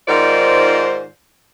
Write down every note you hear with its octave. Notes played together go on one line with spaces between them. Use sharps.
G#2 D#3 F4 C5 D5